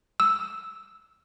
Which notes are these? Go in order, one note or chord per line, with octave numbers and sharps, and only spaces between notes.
E6